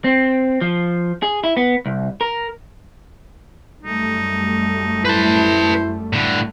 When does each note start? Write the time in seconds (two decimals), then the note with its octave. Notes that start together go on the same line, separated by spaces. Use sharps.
0.04 C4
0.61 F3
1.22 G#4
1.44 E4
1.57 B3
1.86 C2
2.21 A#4
3.83 F#2 G3 A3 D#4
5.05 E4 B4 C5 A5
6.13 A2 D3